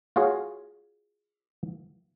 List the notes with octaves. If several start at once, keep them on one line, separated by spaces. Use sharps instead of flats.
F4 F#4 G#4 C#5 F5